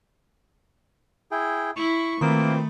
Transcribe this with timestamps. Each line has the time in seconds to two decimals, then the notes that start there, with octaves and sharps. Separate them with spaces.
1.31 E4 G#4 G5
1.76 E4 C#6
2.21 A#2 D#3 E3 A3 A#3 C4 B5